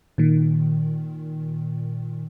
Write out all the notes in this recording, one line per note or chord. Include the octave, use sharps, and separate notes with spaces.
A#2 D#3